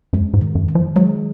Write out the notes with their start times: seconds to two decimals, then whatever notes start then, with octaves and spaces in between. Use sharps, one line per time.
0.13 F#2 G#3
0.34 G#2
0.41 D#3
0.55 F#2
0.68 D#3
0.75 F3
0.96 F#3 G#3